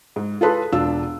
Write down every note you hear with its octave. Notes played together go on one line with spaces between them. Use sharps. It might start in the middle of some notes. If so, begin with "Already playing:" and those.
G#2
F4 G#4 A4 B4 A5 C6
E1 D4 F4 E6